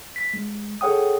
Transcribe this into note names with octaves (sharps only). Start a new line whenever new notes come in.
B6
G#3
G#4 A4 C#5 F#5 G5 D#6